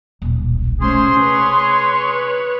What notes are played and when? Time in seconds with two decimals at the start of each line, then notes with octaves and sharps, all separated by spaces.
0.22 D#1 B1
0.81 C3 A3 C#4 G#4 C5 C6
1.21 B4 C#5